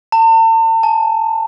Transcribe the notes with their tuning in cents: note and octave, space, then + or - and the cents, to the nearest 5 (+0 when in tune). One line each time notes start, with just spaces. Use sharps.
A5 +40
A5 -40